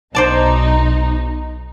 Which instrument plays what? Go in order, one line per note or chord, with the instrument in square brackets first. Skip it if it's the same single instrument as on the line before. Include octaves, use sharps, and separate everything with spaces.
[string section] B1 D#4 [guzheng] C5 D5 A5